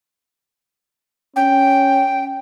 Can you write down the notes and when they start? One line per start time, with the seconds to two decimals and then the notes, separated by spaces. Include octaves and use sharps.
1.36 C#4 G5